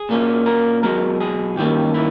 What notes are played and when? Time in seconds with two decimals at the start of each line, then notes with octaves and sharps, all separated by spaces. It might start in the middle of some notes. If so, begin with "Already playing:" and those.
Already playing: G#4
0.09 A#2 A#3 C#4
0.46 A#4
0.83 B1 B2 G#3 A#4
1.21 G#4
1.57 G2 D#3 G3 A#3 C#4 G4
1.94 E4